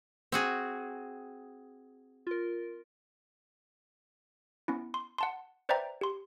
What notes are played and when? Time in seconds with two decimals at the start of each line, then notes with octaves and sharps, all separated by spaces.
0.32 C4 F#4 G#4
2.27 F4 A#4
4.68 B3 C#4 E4
4.94 C6
5.18 F#5 A5 C6
5.69 B4 C5 D5 E5 G5 A#5
6.01 G4 C6